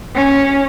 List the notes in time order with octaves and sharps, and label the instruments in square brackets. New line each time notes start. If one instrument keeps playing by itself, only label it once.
[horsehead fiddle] C#4